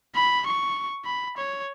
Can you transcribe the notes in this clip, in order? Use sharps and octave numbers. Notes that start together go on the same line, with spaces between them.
B5
C#6
B5
C#5